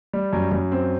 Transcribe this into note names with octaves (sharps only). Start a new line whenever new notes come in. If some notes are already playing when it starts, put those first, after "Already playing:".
G3
F#2
F#2
C4